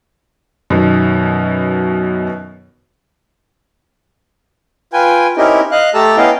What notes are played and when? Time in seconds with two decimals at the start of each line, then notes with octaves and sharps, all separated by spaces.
0.70 F#2 B2 D#3 B3
4.93 F4 B4 G5 G#5
5.37 C4 C#4 D#4 E4 G4 A#4
5.71 D#5 F5 F#6
5.94 A3 G4 A4 A5 A#5 E6
6.17 B3 C#4 E4 D#5 F5 G5